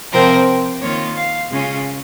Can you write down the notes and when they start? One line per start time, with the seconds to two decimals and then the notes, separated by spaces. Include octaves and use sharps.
0.12 C3 F3 C4 A#4
0.81 D#3 A#3 F4 C#5
1.16 F5
1.51 C#3 G#3 C#4 F4